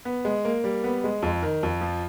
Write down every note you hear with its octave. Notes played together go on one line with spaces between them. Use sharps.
B3
G#3
A#3
G3
B3
G#3
F2
D#3
F2
F3